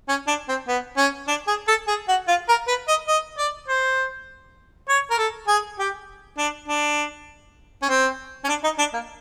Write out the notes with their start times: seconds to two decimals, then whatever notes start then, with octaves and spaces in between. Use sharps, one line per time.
0.08 C#4
0.27 D4
0.48 C4
0.68 B3
0.97 C#4
1.28 D4
1.47 G#4
1.68 A4
1.87 G#4
2.08 F#4
2.28 F4
2.49 A#4
2.67 B4
2.88 D#5
3.08 D#5
3.38 D5
3.68 C5
4.89 C#5
5.10 A#4
5.18 A4
5.48 G#4
5.79 G4
6.38 D4
6.68 D4
7.82 C#4
7.89 C4
8.44 C#4
8.49 D4
8.64 D#4
8.78 D4
8.93 A#3